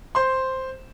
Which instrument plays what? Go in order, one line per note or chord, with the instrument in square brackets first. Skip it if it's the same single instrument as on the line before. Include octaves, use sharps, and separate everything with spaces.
[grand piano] C5 C6